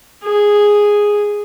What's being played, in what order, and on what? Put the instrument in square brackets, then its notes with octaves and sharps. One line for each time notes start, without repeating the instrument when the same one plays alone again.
[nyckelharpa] G#4